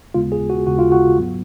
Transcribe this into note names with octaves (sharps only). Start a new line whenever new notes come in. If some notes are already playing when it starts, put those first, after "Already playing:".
D#2 C#3 G#3 B3 F4
G#4
F#4
D#2 C#3 G#3 B3 F#4
F4
F#4
G#2 F#3 B3